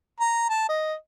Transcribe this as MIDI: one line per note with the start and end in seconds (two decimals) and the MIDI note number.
0.20 0.46 82
0.49 0.66 81
0.69 0.94 75